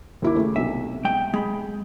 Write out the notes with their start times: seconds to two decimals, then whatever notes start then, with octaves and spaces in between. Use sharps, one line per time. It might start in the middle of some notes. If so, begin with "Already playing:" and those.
0.22 D#2 E4 D6
0.36 C#3 A3
0.56 B1 C3 E5
1.05 G#3 G5
1.34 G#3 B5